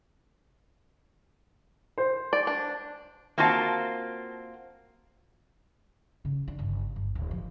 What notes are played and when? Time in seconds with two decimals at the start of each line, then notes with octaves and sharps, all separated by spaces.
1.98 C5
2.33 D5
2.47 D4
3.38 A#3 C4 F4 F#4 G#5 A5
6.25 C#3
6.48 D4
6.59 G1
6.96 G1
7.15 D1
7.31 F3